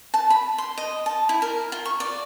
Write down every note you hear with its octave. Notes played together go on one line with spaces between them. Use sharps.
A5
B5
C6
D#5
A5
E4
A#4
F4
C#6
D5